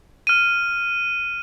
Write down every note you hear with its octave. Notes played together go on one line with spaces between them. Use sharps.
F6 D#7